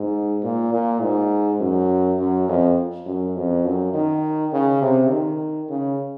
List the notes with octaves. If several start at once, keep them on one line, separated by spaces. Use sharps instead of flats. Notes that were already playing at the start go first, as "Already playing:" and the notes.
Already playing: G#2
A#2
A#2
G#2
F#2
F#2
F2
F#2
F2
F#2
D#3
C#3
C3
D#3
C#3